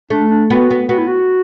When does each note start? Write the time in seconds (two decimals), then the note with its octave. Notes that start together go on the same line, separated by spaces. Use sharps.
0.10 A3 D4
0.30 D4
0.50 B3 F#4
0.71 B3
0.89 B3 F#4
0.98 E4
1.07 F#4